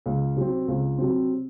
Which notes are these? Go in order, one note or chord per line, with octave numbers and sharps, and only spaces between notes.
C#2
C3 F#3 C4
C#2
C3 F#3 C4